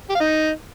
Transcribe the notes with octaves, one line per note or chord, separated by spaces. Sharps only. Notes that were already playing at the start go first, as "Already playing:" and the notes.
G4
F5
D#4